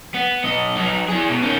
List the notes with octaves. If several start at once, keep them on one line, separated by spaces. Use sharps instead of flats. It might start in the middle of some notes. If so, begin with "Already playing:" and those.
B3
B1 D#5
F#3 D#4
E3 G#4
B2
D#3 C#4